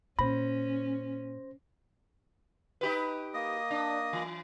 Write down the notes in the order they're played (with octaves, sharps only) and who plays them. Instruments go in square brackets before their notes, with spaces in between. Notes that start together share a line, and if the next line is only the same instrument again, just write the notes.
[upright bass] A#2 [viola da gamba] C#4 [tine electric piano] C5 A#6 [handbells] B5
[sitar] D#4 G4 B4
[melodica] A#3 D#5 D#6
[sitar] D4
E3